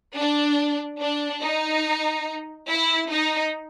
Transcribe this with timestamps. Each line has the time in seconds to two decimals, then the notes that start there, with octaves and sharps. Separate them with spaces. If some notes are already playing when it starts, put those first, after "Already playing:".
0.16 D4
1.01 D4
1.42 D#4
2.70 E4
3.11 D#4